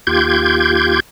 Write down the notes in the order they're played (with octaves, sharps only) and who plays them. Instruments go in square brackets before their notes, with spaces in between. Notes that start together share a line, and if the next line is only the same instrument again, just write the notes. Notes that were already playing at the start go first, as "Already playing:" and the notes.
[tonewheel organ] D#2 F4 G4 G6 G#6